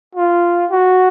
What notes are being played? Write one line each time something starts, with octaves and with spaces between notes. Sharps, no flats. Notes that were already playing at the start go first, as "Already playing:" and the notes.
F4
F#4